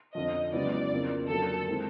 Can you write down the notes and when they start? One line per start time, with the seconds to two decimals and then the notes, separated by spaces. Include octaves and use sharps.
0.15 F2 D3 F3 D#5
0.53 C#2 C#3 F#3 B3 E4 D5
0.91 F2 C#3 F3 A#3
1.29 F2 D3 F#3 A#3 A4
1.68 D#3 G#3 C4 E4